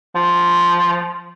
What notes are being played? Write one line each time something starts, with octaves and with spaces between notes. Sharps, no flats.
F3